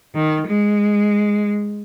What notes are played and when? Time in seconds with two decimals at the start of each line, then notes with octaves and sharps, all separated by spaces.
0.15 D#3
0.47 G#3